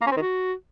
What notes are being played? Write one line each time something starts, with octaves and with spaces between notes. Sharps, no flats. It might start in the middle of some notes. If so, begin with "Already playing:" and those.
A#3
C#4
C4
D#3
F#4